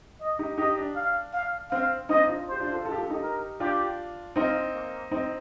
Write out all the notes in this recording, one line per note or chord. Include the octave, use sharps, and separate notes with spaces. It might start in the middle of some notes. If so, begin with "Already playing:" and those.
D#5
D#4 G4
D#4 G4 D#5
D4
F5
F5
C4 F5
C4 D#4 D#5
D4 F4
G4 C5
D4 F4
F4 A4
F4 A4
G4
F4 A4
D#4 G4
A#4
D4 F4 G4
C4 D#4 F4
A#3
C4 D#4